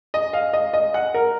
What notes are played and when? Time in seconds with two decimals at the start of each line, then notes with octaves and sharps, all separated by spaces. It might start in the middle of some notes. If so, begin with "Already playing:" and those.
0.14 D#5
0.33 F5
0.53 D#5
0.73 D#5
0.94 F#5
1.14 A#4